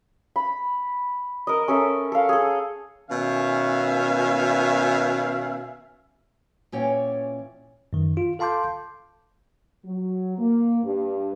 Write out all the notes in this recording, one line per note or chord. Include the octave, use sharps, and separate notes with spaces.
B5
A#4 D#5
C#4 A4 A#4 E5
A4 F5
G#4 A4
B2 D#3 C#4 E5 F5 G#5
A#2 E3 C#4 C#5 D5 G5
F#2 D#3
F4
A4 F5 A5 C6 D6 G6
F#3
A#3
G2